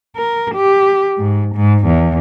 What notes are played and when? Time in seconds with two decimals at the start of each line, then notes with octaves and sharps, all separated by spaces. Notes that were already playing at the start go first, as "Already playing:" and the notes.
0.16 A#4
0.55 G4
1.18 G#2
1.55 G#2
1.86 E2